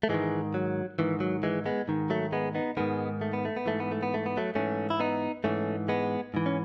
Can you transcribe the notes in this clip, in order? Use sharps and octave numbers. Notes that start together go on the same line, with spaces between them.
A3
G#2 D#3 E3 G#3
F#3
G#2 D#3 E3
F#3
E3 G#3
G#3 B3
G#2 D#3
F#3 A3
G#3 B3
B3 D#4
G#2 D#3 G#3 B3
A3
B3
A3
B3
G#2 E3 A3
B3
A3
B3
A3
B3
F#3 A3
G#2 E3 A3 C#4
E4
B3 D#4
G#2 E3 A3 C#4
G#3 B3
G#2 E3
C#4